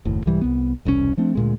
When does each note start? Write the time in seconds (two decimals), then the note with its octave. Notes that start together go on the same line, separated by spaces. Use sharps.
0.05 F#1 D#2 A2
0.26 C2 G#2 E3 G3
0.41 C2 B3
0.85 E1 C2 C3 C#4
1.17 F3 A3 C4 D4
1.35 D2 A#2 G#3